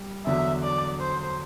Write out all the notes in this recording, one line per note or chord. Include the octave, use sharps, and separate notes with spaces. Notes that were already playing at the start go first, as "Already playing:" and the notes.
Already playing: G3
E2 D3 F#3 E5
D5
C5